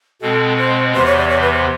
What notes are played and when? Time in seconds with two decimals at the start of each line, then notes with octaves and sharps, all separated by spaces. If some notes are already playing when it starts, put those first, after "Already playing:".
0.21 B2 G#3 C4 A4
0.58 C5
0.94 E2 C3 E3 C5
1.06 C#5
1.17 D5
1.29 C#5
1.41 B4
1.53 C5